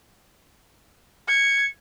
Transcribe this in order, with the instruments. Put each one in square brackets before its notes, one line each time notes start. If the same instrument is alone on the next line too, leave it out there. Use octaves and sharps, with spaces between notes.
[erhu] G#6 [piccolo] C#7